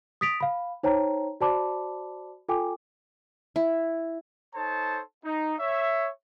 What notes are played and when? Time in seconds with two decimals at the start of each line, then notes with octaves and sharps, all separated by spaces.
0.21 D#6 A6 B6 D7 F7
0.40 F5 B5
0.83 D#4 C5 C#5 G5 A5 A#5
1.41 F#4 C5 D5 A5 B5 D6
2.49 F4 A4 G5 G#5 D6
3.56 E4
4.54 D#4 A4 C5 C#5 A5
5.24 D#4
5.59 C#5 E5